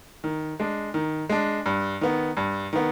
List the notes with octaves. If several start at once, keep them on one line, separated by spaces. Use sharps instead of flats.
D#3
G#3 D4
D#3
G#3 D4
G2
D#3 B3
G2
D#3 B3